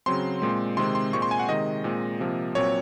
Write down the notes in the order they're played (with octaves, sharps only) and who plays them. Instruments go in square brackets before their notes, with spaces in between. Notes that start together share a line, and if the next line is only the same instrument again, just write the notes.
[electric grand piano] C#3 F#3 C4 C6
A#2 G#3 C4
C3 D#3 G#3 C4 C6
C6
A#2 G#3 C4 C#6
C6
G#5
F#5
C3 D#3 G#3 D#5
A#2 G#3 C4
C3 F3 A#3
A#2 F#3 C4 C#5